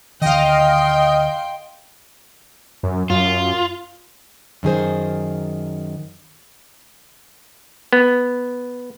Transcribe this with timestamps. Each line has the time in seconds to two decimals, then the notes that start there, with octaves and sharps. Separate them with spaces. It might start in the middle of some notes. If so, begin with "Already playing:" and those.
0.21 D2 D#3 D#5 F5 G5 C6
2.83 F#2
3.10 F#2 F4
4.63 F#2 D#3 G#4 C5
7.93 B3